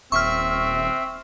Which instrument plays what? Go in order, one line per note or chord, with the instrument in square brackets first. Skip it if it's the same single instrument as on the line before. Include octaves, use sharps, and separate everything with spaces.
[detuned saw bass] D#1 [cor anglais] C4 [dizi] E5 [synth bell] C#6 F6